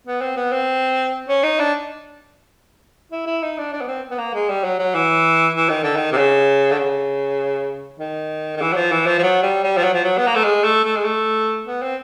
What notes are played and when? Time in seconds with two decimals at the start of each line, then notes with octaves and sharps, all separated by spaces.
0.07 B3
0.21 C4
0.36 B3
0.52 C4
1.29 C#4
1.43 D#4
1.59 D4
3.12 E4
3.26 E4
3.43 D#4
3.58 D4
3.73 D4
3.81 B3
3.88 C4
4.11 B3
4.18 A#3
4.34 G#3
4.49 G3
4.64 F#3
4.79 F#3
4.94 E3
5.56 E3
5.69 D#3
5.83 D3
5.96 D#3
6.12 C3
6.17 C#3
6.71 D3
6.78 C#3
8.00 D#3
8.57 D#3
8.61 E3
8.72 F#3
8.76 F3
8.92 E3
9.06 F3
9.18 F3
9.23 F#3
9.43 G3
9.63 G3
9.77 F3
9.83 F#3
9.94 F3
10.04 F#3
10.18 B3
10.27 A#3
10.35 A3
10.44 G#3
10.64 A3
10.84 A3
10.97 G#3
11.05 A3
11.66 B3
11.82 C4